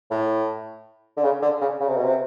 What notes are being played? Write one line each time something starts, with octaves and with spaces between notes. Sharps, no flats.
A2
D3
C#3
D3
C#3
C#3
C3
B2
C3